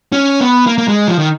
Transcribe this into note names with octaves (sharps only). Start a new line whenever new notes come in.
C#4
B3
A#3
A#3
G#3
F3
D#3